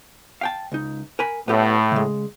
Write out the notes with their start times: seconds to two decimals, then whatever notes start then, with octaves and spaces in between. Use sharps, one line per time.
0.41 F5 G5 A5
0.72 C#2 D#4
1.19 A#4 G#5 B5
1.48 A2 B3 G4 C#5
1.92 C#3 G#3